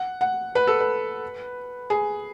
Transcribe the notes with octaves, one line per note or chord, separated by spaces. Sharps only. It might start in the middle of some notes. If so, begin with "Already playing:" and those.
Already playing: F#5
F#5
B4
A4
B4
G#4